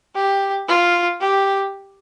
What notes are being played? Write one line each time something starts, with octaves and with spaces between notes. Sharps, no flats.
G4
F4
G4